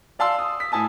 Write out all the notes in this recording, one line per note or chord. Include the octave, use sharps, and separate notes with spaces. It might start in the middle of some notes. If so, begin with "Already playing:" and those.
D5 F5 A5 C6 E6
D#6
B6
A2 G#5 A5 D#6